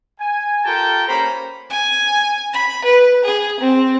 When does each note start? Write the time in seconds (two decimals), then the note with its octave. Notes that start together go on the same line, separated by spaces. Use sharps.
0.20 G#5
0.64 F4 G4 A4 A#4 G5 A5
1.08 A#3 C#4 G4 C5 A#5 B5
1.70 G#5
2.54 B5
2.85 B4
3.25 G#4
3.60 C4